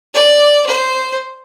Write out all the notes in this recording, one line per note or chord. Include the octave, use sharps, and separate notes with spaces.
D5
C5